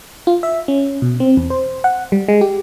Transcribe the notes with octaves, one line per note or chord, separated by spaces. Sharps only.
F4
E5
C#4
B2
C4
E2
C5
F#5
G3
G#3
G4